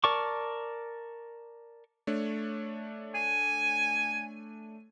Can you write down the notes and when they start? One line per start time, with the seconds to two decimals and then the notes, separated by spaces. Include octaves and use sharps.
0.04 A#4 D5 A5 C#6 D6
2.07 A3 D4 C#5
3.15 G#5